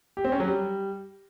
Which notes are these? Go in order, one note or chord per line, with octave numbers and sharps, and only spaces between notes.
G4
C4
C#4
F#3
G3